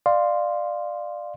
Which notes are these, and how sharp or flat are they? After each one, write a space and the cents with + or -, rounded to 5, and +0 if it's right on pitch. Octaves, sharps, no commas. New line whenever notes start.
D5 +20 F5 +0 C6 +0